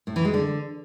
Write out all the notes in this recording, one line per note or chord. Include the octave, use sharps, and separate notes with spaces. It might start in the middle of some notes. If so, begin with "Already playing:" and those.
A2
E3
G#3
D3